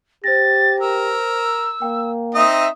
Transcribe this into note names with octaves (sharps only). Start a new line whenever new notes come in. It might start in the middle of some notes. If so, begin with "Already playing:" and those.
G4 C5 A6 A#6
A#4 E6
A#3 G5
C4 D#4 D#5 E5 D#6